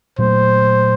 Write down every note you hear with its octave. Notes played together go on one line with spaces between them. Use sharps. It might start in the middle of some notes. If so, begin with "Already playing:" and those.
A#2 F#3 A3 C5